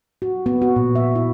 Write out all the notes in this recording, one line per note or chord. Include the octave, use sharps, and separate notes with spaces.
F#4
B3
F#4
A#2
E5
E4